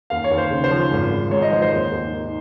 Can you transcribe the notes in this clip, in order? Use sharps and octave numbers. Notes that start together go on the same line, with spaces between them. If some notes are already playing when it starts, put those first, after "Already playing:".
D#2 F5
C#5
D#2
C5
C#3
C5
F3
G#1
G#1
G#2 C#5
D#5
F3 C5
C5
D#2
D#2
D#3